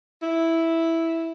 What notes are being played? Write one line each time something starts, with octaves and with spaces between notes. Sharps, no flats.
E4